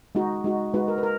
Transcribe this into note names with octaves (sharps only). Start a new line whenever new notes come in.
G#3 D#4 F#4
G#3 D#4 F#4
G#3 D#4 F#4 B4
A#4
B4
A#4